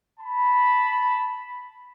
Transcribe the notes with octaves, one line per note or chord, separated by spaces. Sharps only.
A5 B5